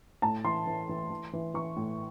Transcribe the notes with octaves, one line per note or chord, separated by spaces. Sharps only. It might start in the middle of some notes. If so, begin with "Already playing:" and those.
A2 A5
E3 C6
E3
E3
E3
E3
E3 C#6
A2